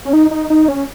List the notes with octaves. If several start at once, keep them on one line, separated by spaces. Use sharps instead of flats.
C#4
D#4
D#4
D#4
C#4